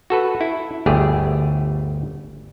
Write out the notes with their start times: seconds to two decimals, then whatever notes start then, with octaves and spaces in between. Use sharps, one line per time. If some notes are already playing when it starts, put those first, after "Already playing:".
0.10 F#4 A4 B4
0.41 E4
0.86 G1 D2 A3 G4 G#4